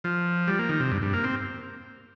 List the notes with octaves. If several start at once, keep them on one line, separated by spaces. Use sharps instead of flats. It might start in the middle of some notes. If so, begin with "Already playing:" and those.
F3
G3
A#3
D#3
C3
G2
G2
A#3
C4